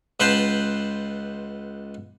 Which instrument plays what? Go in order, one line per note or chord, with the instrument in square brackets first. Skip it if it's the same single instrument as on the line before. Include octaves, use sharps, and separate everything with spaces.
[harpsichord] C#2 B4 F#5 G5 A5 C6